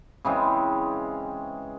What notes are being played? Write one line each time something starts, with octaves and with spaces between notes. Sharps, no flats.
C#3 E3 G#3 C4